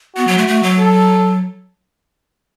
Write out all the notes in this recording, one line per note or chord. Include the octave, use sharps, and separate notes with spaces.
B3 F#4
F#3
A3
A3
F#3
A4